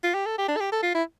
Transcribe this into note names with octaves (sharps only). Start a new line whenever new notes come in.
F4
G4
A4
G4
D4
A4
G4
A4
F4
E4